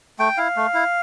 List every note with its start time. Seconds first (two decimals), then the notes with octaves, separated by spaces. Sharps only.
0.19 A3 G5
0.37 E4 F5
0.57 A3
0.74 E4